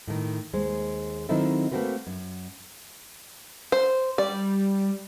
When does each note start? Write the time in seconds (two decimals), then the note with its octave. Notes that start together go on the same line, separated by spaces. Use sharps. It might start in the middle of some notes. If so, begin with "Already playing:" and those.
0.08 A2 D#3
0.53 D#2 G#3 C5
1.29 D#3 F#3 C4 D#4 E4 A4
1.72 A3 A#3 C4 F#4 B4
2.07 F#2
3.72 C5
4.18 G3 D5